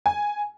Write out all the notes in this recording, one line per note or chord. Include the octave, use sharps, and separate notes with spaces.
G#5